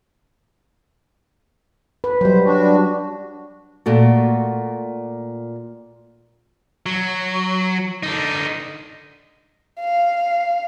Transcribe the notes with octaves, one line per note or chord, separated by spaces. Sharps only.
B4
F#3 G3 C5
D4 F#4
A#2 A3 F#4
F#3
D3 D#4
F5